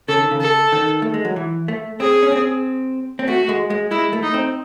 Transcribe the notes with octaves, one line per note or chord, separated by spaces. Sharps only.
C#3 A4
D#3
C#3
A4
D#3
A3
G#3
F#3
E3
A3
C4 G#4
C#4
C4
C4
A3 F#4
G#3
G#3
G#3 E4
A3
D#4
C4